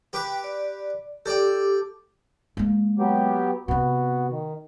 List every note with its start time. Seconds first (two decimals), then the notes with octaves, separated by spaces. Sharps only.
0.13 G4 B4 G5 D6
0.44 D5
1.26 G4 A4 D5 G5 D6
2.57 G#3 A#3
2.99 F#3 B3 G4
3.68 C3 B3 C4 F#4
4.30 D#3